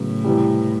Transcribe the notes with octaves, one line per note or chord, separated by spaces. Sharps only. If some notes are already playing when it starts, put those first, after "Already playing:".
Already playing: A2 C#3 F#3 B3
E2 C3 E3 G3